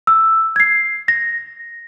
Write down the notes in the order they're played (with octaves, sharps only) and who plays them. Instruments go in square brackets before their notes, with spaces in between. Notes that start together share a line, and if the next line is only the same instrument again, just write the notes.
[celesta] E6
G#6 C7
A#6